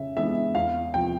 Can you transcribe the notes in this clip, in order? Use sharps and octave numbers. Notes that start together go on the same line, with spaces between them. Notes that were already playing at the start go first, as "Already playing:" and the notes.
Already playing: C#3 E5
E3 G#3 B3 D4 E5
E2 F5
C3 F3 G5